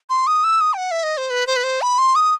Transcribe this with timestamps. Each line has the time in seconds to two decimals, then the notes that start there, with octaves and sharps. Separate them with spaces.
0.10 C6
0.27 D#6
0.44 E6
0.61 D#6
0.73 G5
0.77 F#5
0.91 E5
1.03 D#5
1.17 C5
1.30 B4
1.47 C5
1.56 B4
1.64 C5
1.82 B5
1.98 C6
2.15 D#6